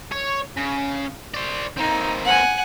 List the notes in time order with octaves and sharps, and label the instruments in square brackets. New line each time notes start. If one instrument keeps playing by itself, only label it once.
[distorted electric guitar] C#5
C#3
C5 D5
[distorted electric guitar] A#3 C4 [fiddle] D#4
[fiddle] F#5 G#5